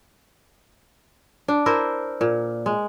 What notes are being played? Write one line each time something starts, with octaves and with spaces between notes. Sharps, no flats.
D4
E4 A#4 C5
A#2
G#3